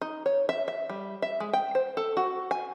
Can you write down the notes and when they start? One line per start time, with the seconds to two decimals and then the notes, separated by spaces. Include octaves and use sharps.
0.01 D#4
0.26 C#5
0.49 E5
0.68 E5
0.89 G3
1.22 E5
1.40 G#3
1.53 G5
1.75 C5
1.97 A4
2.17 F#4
2.51 G#5